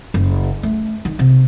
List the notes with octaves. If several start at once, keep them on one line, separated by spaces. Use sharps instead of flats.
F#1
A3
D#3
C3